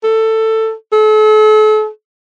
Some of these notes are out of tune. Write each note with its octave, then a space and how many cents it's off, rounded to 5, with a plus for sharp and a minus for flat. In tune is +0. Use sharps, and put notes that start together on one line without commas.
A4 +15
A4 -40